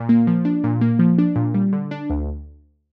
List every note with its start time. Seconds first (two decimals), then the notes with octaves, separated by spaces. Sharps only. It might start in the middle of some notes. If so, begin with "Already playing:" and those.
Already playing: A#2
0.09 A#3
0.27 F3
0.45 D4
0.64 A#2
0.81 A#3
0.99 F3
1.18 D4
1.36 A#2
1.54 G3
1.73 D3
1.91 D4
2.10 D2